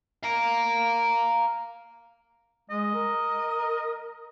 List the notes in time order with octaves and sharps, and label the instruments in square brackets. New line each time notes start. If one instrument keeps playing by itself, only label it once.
[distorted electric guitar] F5 A#5
[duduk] G#3 [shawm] D#5
[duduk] A#4